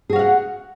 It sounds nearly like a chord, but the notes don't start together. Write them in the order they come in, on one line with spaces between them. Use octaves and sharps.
G#4 F#4 F5 F#5